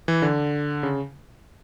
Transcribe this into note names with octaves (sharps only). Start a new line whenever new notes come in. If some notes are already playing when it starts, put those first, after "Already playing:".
E3
D3
C#3